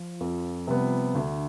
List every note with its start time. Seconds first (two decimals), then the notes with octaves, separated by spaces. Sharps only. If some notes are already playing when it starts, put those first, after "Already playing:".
Already playing: F3 F4
0.20 F2
0.67 C3 G3 B3
1.15 D2 D3 D4